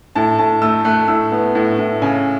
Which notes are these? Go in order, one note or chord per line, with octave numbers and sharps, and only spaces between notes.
A2 A5
A2 A5
A3 E6
A3 F#6
A2 E6
B3
A2
A2
C#3 G#5